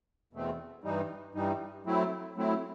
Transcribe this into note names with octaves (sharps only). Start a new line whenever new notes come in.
E2 B2 A3 C4
G2 E3 G3 D#4
G2 E3 G3 D#4
F#3 A3 C4 E4
F#3 A3 C4 E4